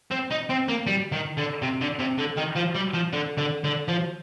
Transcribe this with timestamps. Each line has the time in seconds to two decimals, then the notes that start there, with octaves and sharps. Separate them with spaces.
0.11 C4
0.30 D#4
0.49 C4
0.68 A#3
0.87 G3
1.12 D#3
1.37 D3
1.62 C3
1.81 D3
1.99 C3
2.18 D3
2.37 D#3
2.56 F3
2.75 G3
2.94 F3
3.13 D3
3.37 D3
3.64 D3
3.88 F3